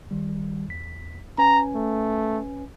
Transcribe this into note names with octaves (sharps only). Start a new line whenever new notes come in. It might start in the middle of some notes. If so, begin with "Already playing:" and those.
G#1 D#3 G3
E2 B6
C#4 B4 G#5 A#5
A3